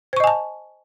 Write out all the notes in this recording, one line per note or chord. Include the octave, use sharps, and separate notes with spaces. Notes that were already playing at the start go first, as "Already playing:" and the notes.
C5 D#5 G#5 A5 C#6